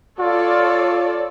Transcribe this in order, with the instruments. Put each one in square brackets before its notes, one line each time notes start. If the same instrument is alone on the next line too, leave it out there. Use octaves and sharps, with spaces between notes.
[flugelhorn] F4 [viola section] A4 C#5 D5